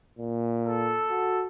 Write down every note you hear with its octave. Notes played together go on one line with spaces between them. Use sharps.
A#2
A4
F#4